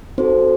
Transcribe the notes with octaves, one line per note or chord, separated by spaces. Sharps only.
C4 D#4 F#4 A4 C5